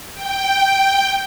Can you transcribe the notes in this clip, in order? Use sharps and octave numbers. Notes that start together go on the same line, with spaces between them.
G5